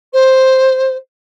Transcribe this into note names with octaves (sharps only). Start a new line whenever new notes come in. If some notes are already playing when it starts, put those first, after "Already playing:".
C5